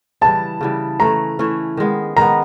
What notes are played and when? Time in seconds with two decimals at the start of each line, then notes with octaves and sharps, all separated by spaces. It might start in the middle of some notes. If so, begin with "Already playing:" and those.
0.21 C#3 E3 G3 A5
0.61 C#3 E3 G3
1.00 E3 A3 C#4 A#5
1.39 E3 A3 C#4
1.77 D#3 G#3 B3
2.16 D#3 G#3 B3 A#5